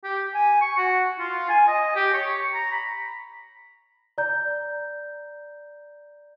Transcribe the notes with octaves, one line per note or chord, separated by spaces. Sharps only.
G4
G#5
C#6
F#4
F4
G#5
D#5
G4
C#5
A#5
B5
D5 A#5 G6